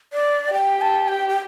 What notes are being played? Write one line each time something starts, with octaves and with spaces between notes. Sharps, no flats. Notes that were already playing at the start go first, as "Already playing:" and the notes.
D5
G4 G5
A5
G5
G5